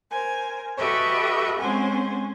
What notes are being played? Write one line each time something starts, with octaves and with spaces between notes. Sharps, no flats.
A#4 C5 G#5
F#4 G4 A4 B4 D#5 E5
G#3 C4 C#4 C5 F#5 G#5